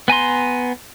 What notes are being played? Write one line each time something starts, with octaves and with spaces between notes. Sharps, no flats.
B3 G#5 A#5 C6